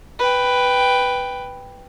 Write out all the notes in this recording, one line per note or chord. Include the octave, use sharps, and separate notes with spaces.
B4 G5